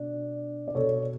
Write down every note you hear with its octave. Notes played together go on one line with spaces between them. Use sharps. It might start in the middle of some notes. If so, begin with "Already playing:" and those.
Already playing: B2 D4
D5
B2 A4 C#5